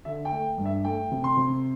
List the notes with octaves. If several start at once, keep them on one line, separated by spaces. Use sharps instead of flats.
D3 E5
G5
A3
G2
E5
A3 G5
C3
C6
C3